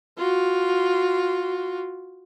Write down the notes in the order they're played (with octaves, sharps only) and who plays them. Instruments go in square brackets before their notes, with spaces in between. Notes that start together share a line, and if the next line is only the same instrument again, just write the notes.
[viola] F4 F#4